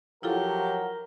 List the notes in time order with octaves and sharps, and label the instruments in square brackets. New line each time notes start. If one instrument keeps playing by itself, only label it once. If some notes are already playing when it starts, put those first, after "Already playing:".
[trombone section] F3 F#3 [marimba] E4 F4 A4 [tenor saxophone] G4 [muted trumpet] A#4